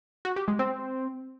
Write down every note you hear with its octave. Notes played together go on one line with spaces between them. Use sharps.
F#4
G4
G#3
C4